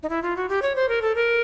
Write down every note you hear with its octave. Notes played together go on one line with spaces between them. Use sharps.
D#4
E4
F4
F#4
G4
C#5
C5
A#4
A4
A#4